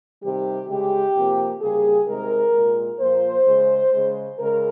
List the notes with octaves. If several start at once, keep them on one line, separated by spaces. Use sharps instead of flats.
C3 D#3 G3 G4
C#3 G#3 G4
C3 F3 A#3
C#3 G3 A#3 G#4
C3 D#3 G#3 A#4
A#2 G#3
A#2 F3 A#3 C5
C#3 G#3
C#3 G#3
C#3 G#3 A#4